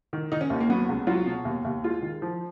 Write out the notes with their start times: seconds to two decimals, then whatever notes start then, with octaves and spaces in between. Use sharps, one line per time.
0.13 D#3
0.32 D#3 D#4
0.41 C#4
0.50 D#2
0.60 A#3
0.69 F#3 B3
0.89 C#2
1.07 F#3 F4
1.26 B2
1.45 D#2
1.65 D#2
1.84 G#3 F4
2.02 D#3
2.22 F3